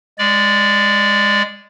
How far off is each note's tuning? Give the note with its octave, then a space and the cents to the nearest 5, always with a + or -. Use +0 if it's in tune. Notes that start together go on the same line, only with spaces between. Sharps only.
G#3 -15 D5 +0